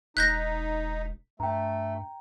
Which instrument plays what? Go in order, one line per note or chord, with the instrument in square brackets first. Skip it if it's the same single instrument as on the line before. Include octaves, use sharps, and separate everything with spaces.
[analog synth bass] E1 [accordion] D#4 [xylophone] F#6 G6 A#6 [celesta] B6
[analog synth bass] G2 [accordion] A3 [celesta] G5 A#5